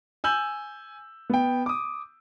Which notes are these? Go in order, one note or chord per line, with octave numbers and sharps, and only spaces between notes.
G#5 E6 G6 F#7
B3 G5
D6 D#6